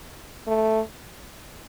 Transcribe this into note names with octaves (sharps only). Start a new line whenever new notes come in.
A3